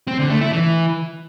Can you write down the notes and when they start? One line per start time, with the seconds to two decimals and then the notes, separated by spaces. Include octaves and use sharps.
0.08 C4
0.19 D3
0.30 A3
0.41 E4
0.53 E3